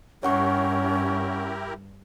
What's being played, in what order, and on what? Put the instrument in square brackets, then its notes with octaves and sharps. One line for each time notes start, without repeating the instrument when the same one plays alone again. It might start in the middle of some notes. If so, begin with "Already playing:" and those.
[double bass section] G2 [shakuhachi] C#4 [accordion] E4 G4 A#4 [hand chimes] C#5 F#5 C#6